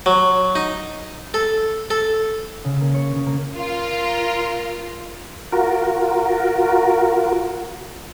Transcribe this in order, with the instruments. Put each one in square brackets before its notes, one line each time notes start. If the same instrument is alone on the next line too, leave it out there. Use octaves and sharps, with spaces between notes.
[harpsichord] F#3
D#4
A4
A4
[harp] C#3
A#3
C#5
C#3
A#3
[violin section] F4 [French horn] A#4
[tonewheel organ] F4 F#4 A#4